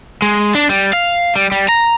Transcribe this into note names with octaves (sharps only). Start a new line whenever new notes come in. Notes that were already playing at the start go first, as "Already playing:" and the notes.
G#3
D4
G3
F5
G3
G3
A#5